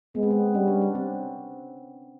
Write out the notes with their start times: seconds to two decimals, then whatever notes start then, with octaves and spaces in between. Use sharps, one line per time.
0.15 G#3 B3
0.23 C4
0.31 B3
0.55 G3 C#4
0.68 D4
0.82 D4
0.95 C4